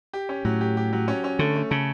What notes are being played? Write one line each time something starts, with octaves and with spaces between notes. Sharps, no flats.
G4
C#4
A2 F#3
G4
G4
F#3
C#4
C#4
D3 A3
A3
C#3 A4